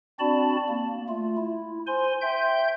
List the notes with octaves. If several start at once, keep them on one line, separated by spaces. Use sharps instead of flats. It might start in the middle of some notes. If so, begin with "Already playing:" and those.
C4 D4 F#4 D5 A5 B5
A#3
A3 F4
E4
C5 G#5 C6
E5 G5 C6 G6